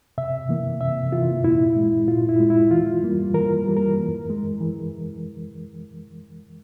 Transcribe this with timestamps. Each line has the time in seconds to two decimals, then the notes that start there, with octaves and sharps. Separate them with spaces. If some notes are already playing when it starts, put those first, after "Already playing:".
0.18 C3 E5
0.49 E3 A#3
0.81 C3 E5
1.12 E3 A#3 F4
1.44 A#2 E4
1.76 G#3
2.08 A#2 F4
2.29 E4
2.40 G#3
2.50 E4
2.71 E3 F4
3.03 G3 A#3
3.34 E3 A#4
3.66 G3 A#3
3.76 A#4
3.97 E3
4.30 G#3
4.60 E3